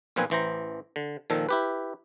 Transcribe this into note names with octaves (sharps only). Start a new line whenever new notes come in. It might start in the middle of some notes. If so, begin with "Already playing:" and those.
B1 A#2 F3 C4 B4 G#5
A1 E3 C5 A#5
D3
A#2 D#3 F3 A4
E4 G4 B4